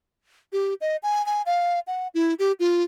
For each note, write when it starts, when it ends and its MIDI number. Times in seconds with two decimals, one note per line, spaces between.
0.53 0.74 67
0.81 0.97 75
1.03 1.24 80
1.26 1.42 80
1.46 1.80 77
1.87 2.08 78
2.14 2.34 64
2.39 2.52 67
2.60 2.83 65